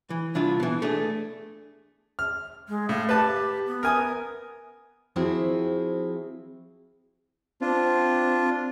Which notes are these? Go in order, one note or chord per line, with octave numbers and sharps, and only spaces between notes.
E3
C2 D4 E4 F4
B2 E3
A3 D4 G#4
F6
G#3
A2 F5
G4 B4 A5
B3
A#4 G#5 D#6
F3 C4 E4 F#4 G#4 C5
C4 D4 F4